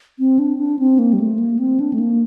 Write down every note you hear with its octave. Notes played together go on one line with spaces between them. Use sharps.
C4
D4
D4
C4
A#3
G3
A3
A#3
C4
D4
A3
A#3